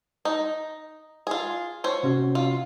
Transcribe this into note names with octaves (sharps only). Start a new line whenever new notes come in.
D#4
F4 G#4
C5 C#5
C3 C#4 F#4
F4